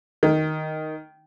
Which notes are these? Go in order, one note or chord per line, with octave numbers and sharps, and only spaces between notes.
D#3